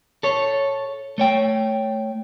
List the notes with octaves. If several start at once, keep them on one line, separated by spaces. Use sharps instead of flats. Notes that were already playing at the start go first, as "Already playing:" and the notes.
A4 C#5
A3 C#5 G5